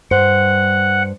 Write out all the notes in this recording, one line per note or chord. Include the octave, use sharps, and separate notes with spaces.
G2 C5 F#5